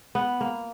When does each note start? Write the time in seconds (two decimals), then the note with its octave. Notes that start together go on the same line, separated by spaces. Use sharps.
0.15 B3
0.41 A#3